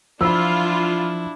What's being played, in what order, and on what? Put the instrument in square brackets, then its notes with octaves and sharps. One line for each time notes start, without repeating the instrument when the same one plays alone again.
[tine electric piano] F3 [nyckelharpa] D4 E4 [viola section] F4 [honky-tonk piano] B5 E6